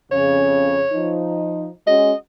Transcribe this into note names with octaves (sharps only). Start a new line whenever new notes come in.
F2 C#3 C#5
F3 D#4
G#3 C#4 F#4 D#5